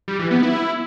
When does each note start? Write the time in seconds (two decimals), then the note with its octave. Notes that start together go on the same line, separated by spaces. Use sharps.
0.08 G3
0.19 E3
0.31 B3
0.42 E4